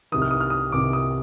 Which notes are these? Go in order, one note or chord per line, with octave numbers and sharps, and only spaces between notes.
C2 C3 D#3 D#6
F6
D#6
F6
D#6
C2 C3 D#3 D6
D#6